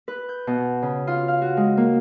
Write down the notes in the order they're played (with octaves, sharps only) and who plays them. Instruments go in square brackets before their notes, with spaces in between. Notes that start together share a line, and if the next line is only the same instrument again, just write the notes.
[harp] B4
G6
B2
C#3
F4
F5
F#4
G#3
A#3